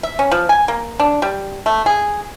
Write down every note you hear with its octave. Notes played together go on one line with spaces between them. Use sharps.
E5
C#4
F3
G#5
A#3
D4
G3
A3
G#4